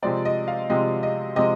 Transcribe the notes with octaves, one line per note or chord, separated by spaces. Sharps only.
C3 F3 G#3 C4 D5
D#5
F5
C3 F3 G#3 C4 D#5
D#5
C3 F3 G#3 D#5